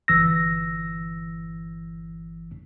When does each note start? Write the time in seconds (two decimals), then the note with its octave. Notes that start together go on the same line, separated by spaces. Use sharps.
0.08 G1 E3 E6 A#6